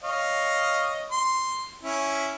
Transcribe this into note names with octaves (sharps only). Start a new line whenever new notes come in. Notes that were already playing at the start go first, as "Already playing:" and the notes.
C#5 D#5 F5
C6
C#4 E4